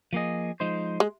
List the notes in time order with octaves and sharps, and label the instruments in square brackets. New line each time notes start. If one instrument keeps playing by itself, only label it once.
[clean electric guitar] F3 A#3 G#4 D#5
F3 G#3 D#4 C5
[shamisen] G#3